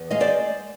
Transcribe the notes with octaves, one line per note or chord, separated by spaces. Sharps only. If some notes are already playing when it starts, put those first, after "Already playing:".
Already playing: E2
G#3 D#5 F5
C5 D5